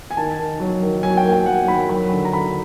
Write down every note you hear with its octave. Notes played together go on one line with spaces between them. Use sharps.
G#5
D#3 A5
D#3
F#3
D#3
F#3 G#5
G5
A#3
G5
F#3 F#5
D#3 B5
F#3 B5
D3
A#5
D3 B5